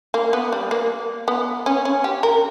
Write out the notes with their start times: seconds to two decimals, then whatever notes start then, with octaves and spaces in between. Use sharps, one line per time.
0.14 A#3
0.33 B3
0.52 G3
0.71 A#3
1.28 B3
1.66 C#4
1.85 C#4
2.04 G4
2.23 A#4